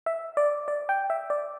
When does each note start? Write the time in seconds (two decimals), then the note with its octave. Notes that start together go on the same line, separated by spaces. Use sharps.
0.06 E5
0.37 D5
0.68 D5
0.89 G5
1.10 E5
1.30 D5